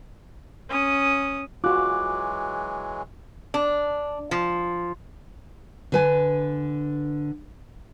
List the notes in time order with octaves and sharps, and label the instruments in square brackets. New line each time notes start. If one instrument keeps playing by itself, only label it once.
[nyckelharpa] C#4 D#6
[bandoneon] E3 F#3 G#3 [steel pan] F4 F#4 [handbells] D6 F#6
[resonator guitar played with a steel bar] D4
F3
[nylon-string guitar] D3 B4 G#5